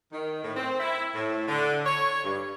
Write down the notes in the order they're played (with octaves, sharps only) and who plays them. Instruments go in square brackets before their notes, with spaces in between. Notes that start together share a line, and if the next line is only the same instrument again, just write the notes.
[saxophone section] D#3
A2
C4
E4
A2
D3
C#5
G2